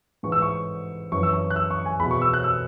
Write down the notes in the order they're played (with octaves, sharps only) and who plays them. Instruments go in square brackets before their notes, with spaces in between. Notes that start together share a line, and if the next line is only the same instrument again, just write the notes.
[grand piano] G#2 E3 C#6
E6
C#6
F#2 E3 C#6
E6
C#6
F#6
E6
C#6
G#5
E2 B5
B2
C#6
E6
F#6
E6